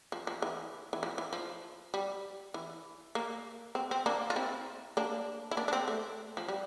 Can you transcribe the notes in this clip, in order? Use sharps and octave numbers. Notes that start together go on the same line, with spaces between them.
F3
F3
E3
E3
F3
E3
F3
G3
E3
A#3
C4
C4
A#3 D4
F4
C4 E4
A#3 D4
E4
A#3 D4
D4
C4
A3
F3
G3